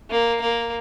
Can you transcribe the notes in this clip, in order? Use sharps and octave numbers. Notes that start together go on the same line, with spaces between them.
A#3
A#3